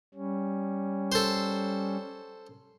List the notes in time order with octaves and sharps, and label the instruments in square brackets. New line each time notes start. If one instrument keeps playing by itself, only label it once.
[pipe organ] G3 C#4
[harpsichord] A4 C5